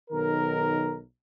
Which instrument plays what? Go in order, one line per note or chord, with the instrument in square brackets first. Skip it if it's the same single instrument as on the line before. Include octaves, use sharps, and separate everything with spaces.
[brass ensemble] B1 D#3 A#4